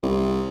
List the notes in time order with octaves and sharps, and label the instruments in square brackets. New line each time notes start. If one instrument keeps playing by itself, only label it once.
[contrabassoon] C2